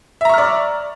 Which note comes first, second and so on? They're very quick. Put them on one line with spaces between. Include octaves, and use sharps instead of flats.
E5 A#5 C#6 F6 D5